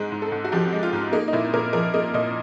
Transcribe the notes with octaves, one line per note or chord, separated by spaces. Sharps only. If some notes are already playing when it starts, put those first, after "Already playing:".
Already playing: G#2 G#3
G#2
A4
G#2
F#4
F3 G4
G#3
F4
G#2
A#3 D#4
D#4
A#2 E4
A#2 A#4
F3 A#4
A#3 D#5
A#2 D#5